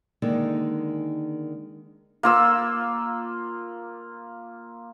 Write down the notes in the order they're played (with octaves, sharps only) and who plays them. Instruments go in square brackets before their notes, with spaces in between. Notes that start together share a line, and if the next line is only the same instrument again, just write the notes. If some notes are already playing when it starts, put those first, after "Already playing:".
[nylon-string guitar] D3 D#3 G#3 A#3 D#4 A4
[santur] A#3 F4 E6